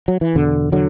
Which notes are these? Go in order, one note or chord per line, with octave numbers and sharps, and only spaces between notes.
F#3
E3
E2 B2 D3
D3 F#3